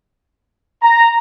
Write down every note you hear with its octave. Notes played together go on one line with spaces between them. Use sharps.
A#5